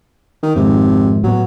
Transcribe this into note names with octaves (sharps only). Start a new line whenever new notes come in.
D#3
F2 G#2 C3 D#3
A2 F#3 B3